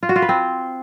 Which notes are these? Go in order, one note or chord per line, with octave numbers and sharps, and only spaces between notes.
F4
F#4
F4
B4
C4